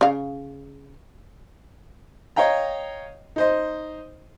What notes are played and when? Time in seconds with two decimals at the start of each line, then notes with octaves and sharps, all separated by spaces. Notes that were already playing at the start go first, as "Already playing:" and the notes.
0.01 C#3 F5
2.36 C#5 D#5 F5 G5 A#5
3.36 D#4 C5 D#5